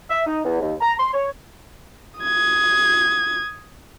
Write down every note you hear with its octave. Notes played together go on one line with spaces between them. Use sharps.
E5
D#4
E2
D#2
A#5
C6
C#5
D#6 G#6